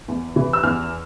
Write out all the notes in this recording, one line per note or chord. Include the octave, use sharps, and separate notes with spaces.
E2
E3
E6
E2 F6